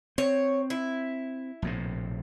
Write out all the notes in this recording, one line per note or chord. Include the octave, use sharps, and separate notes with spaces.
C4 C#5
E4
A#1 A2 C3